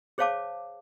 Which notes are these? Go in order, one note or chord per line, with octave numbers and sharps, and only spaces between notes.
G#4 C5 C#5 F5 A5 D6